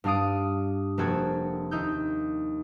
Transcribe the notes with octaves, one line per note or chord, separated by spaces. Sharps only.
G2 D4 F5 D#6 D7
F1 A#3 C4 F#4 A4 G#6
D#2 D#4 E6 G6